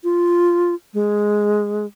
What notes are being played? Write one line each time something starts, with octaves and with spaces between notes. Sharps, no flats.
F4
G#3